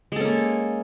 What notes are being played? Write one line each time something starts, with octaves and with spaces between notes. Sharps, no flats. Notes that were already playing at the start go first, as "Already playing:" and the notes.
G#3 A#3 C#4 A4